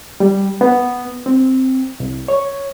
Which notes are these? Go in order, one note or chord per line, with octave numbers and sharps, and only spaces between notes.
G3
B3
C4
C2
C#5